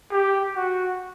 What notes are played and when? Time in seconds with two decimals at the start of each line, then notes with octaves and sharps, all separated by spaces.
0.12 G4
0.56 F#4